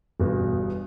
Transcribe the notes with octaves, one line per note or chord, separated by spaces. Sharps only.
G1 E2 G2 B2